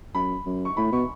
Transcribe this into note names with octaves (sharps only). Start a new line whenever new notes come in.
F#2 B5
F#2
C#6
A2 B5
B2 C#6